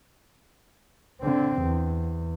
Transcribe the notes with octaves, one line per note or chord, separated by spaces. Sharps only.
D3 C4
E2